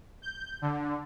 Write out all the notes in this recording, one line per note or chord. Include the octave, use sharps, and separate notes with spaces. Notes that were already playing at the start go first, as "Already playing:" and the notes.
G6
D3